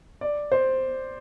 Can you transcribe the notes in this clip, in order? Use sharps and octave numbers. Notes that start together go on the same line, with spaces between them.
D5
C5